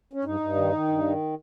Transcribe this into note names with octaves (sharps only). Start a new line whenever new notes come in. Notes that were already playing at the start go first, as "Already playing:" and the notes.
C#4
G2 D#4
G2
D#3
D#3
G2
D#3